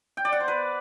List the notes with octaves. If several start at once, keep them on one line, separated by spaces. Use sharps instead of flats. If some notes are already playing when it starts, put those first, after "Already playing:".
G5
D5
F#5
C5
B4